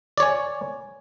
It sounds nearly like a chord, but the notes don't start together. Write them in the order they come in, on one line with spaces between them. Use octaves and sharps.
D5 C#5 G#5